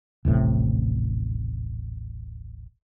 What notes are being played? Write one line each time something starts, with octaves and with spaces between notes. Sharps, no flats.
D#1 A1 A2 C3